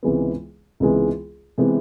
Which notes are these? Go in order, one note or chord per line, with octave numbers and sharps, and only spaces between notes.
C#2 C3 E3 G#3 B3
C#2 C3 E3 G#3 B3
C3 E3 G#3 B3